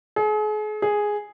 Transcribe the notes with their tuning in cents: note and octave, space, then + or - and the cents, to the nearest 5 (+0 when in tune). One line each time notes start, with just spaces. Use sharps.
G#4 +40
G#4 +0